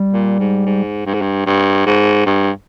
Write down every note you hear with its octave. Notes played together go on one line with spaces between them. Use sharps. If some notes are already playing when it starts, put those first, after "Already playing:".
Already playing: G3
A#2
G#2
G#2
G2
G#2
G2
G2
G#2
G2